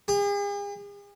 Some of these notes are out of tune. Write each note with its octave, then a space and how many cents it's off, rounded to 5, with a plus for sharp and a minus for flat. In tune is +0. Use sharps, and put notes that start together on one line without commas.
G#4 -45